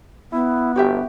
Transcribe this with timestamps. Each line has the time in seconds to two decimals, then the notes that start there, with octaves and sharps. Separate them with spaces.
0.32 B3 E4
0.76 G1 F#4 G4 E5